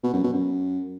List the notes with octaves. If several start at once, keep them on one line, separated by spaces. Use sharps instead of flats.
B2
F#2
B2
F#2